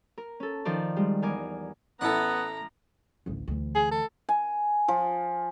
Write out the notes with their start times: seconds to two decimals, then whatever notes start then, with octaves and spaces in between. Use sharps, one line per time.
0.18 A#4
0.40 C#4 A4
0.65 D#3 F3 A#4 D5
0.96 G3 G#3
1.22 E2 A#4 G#5 D6
2.01 A1 B3 E4 A4 F#5 A#5
3.26 A1 D2
3.48 D2 E3
3.76 G#4
3.91 A4
4.29 G#5
4.88 F3